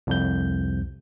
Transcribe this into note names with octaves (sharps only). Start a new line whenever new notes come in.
C2 F2 G6